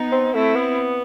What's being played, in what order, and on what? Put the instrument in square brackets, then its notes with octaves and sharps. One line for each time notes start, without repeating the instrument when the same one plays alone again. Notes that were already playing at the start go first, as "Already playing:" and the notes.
Already playing: [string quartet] B3 D#4
[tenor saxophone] C4
[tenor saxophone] A3 [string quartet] C4 E4
[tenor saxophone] B3